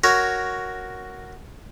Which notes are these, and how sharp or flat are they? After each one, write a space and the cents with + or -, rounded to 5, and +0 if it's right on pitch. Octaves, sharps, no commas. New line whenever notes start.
F#4 +0 A#4 +0 C#5 +5